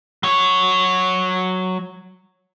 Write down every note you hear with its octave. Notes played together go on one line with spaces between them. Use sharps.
F#3 C#5